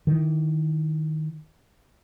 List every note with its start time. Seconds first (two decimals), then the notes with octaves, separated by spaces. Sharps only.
0.07 D#3 E3